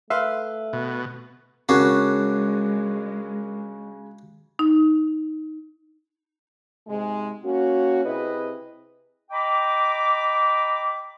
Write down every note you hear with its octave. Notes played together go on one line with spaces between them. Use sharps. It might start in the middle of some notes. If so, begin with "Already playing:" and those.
A3 B4 E5 F5 C6
B2
C#3 G#3 C#4 D4 F#4 A#4 D6 C7
D#4
G#2 C3 G#3
A#3 C#4 F#4
C3 E4 G#4 B4 D#5
D#5 G5 A#5 B5 D6